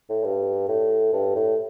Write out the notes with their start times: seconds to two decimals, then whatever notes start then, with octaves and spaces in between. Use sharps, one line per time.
0.09 A2
0.24 G2
0.68 A2
1.13 G2
1.35 A2